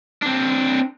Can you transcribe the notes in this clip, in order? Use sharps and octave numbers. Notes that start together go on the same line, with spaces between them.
C4 D4